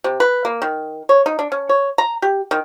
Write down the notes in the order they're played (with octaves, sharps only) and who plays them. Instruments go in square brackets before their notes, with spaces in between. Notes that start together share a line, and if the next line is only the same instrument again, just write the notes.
[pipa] C3
B4
A#3
D#3
C#5
D#4
D4
C#4
C#5
A#5
G4
D#3